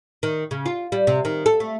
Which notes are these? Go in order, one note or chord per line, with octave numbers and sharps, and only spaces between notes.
D#3
C#3
F4
G3
C3
D#3
A4
A3